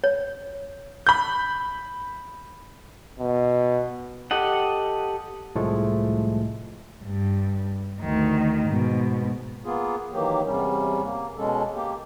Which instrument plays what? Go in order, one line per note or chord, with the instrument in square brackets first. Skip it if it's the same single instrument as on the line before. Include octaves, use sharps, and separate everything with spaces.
[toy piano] C#5
[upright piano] B5 G6
[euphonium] B2
[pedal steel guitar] G4 A4 D#5 F#5
[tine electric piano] C2 A2 F3 G#3 A3
[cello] G2
D2 D#3
G#2 B2
[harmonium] A#3 B3 F4 G#4
D#3 E3 F#3 A#3 G4
E2 C3 G3 C#4
A#3
B2 G#3 C#4 A4
A#3 G4